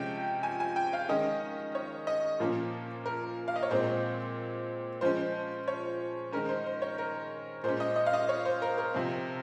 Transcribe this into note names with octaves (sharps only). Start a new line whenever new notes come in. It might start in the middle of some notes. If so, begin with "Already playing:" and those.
Already playing: C3 F3 G#3 C#4 G5
G#5
G#5
G5
F5
D#3 G#3 C#4 D#5
C#5
D#5
A#2 F3 A#3 C#4
A#4
F5
D#5
C#5
A#2 G#3 C4 C5
F3 G#3 C#4 C5
C#5
D#3 G#3 C#4 A#4
C5
C5
C#5
A#4
A#2 G#3 C#4 C5
D#5
D#5
F5
D#5
C#5
C5
A#4
A#4
C3 F3 C4